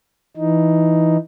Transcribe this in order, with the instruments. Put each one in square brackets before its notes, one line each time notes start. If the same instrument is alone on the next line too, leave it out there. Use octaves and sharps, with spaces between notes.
[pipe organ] E3 D#4